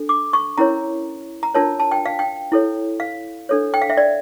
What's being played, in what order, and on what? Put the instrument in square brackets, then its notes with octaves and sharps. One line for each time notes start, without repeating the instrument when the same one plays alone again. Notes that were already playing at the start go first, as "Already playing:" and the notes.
Already playing: [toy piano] D4 A4
D6
C#6
C#4 E4 A#4 C#5 A#5
A#5
D4 F4 A#4 C#5 A5
A5
G5
F5
G5
E4 A4 C#5
F5
D4 A4 C#5
G5
F5
E5
D5